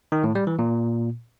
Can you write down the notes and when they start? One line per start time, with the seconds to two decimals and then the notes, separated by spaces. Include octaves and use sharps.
0.12 D#3
0.24 A2
0.35 G3
0.47 E3
0.59 A#2